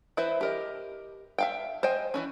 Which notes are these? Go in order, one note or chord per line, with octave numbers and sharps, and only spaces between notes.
E3 E4 B4 C5 E5
G4 A#4 D#5
E5 F5 G5
C5 D#5 G5 G#5
E3 F#3 C#4